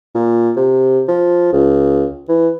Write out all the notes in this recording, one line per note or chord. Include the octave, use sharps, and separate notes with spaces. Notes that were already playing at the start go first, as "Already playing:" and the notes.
A#2
C3
F3
C#2
E3